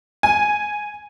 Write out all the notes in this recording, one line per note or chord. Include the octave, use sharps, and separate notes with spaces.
G#5